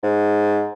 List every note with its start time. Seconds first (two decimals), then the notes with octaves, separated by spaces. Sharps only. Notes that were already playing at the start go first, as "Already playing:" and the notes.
0.03 G#2